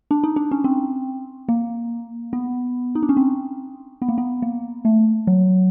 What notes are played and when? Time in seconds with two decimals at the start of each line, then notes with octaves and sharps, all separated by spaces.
0.11 D4
0.24 D#4
0.36 D4
0.51 C#4
0.64 C4
1.49 A#3
2.33 B3
2.95 D#4
3.03 D4
3.09 C#4
3.17 C4
4.02 B3
4.08 A#3
4.18 B3
4.42 A#3
4.85 A3
5.27 F#3